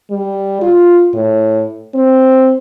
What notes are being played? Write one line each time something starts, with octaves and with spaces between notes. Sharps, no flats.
G3
F4
A2
C4